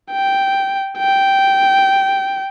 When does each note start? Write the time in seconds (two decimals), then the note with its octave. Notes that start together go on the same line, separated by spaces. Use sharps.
0.12 G5
0.99 G5